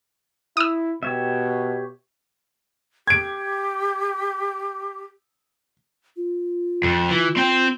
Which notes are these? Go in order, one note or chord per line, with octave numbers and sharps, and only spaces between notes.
E4 D#6 E6
B2 G4 C#5 E5
G4 G#6 D7
F4
F2
E3
C4 G5